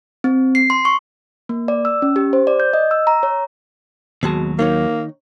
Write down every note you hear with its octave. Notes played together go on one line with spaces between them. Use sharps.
C4
C7
C6
C#6
A#3
D5
E6
C#4
G4
C5
D5
G6
D#5
E6
A#5
C#5
D#2 B2 F#3 G#3 A5
D#3 A#3 D#4 C#5